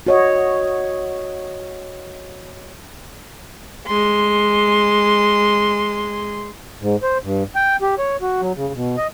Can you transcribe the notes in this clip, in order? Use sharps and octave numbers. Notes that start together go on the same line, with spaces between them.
F#4 C#5 D#5
G#3 C6
G#2
C5
G2
G5
G4
C#5
F#4
F#3
C#3
B2
D#5